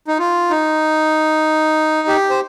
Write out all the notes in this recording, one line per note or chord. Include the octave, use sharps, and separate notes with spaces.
D#4
F4
D#4
G4
C5